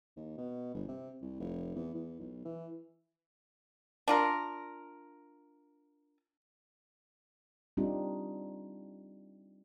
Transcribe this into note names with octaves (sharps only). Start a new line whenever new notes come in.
D#2
B2
G1
C3
C2
F1
E2
E2
B1
E3
D4 F4 A#4
G3 C4 D4 D#4 F4 G4